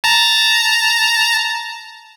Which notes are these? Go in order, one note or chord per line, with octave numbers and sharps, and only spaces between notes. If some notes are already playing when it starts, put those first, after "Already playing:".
A5 A#5